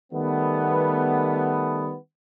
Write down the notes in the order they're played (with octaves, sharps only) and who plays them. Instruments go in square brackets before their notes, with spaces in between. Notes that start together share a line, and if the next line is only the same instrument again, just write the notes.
[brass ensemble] D#3 G3 A3 B3